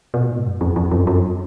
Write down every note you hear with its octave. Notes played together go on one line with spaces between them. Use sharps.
B2
G#2
F#2
F2
F2
F#2
F#2